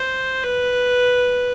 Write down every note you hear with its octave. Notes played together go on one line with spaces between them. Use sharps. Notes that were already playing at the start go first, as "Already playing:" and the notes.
Already playing: C5
B4